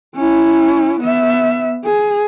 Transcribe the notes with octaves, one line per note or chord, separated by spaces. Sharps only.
C#4 E4
B3 E5
G#4